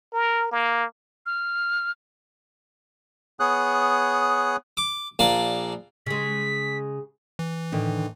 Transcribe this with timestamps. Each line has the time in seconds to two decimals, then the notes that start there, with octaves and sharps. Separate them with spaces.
0.14 A#4
0.52 A#3
1.26 F6
3.40 B3 G#4 C#5 D#6 F#6
4.77 D6
5.19 A#1 A#3 D5 A5
6.06 C#3 G#3 B6
7.39 E3
7.72 A2 D3 D#3